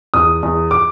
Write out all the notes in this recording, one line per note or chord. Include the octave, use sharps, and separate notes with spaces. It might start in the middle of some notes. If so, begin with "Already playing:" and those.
E2 D#6
E2
D6